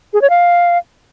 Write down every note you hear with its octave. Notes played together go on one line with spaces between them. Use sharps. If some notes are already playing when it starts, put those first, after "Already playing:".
G#4
C#5
F5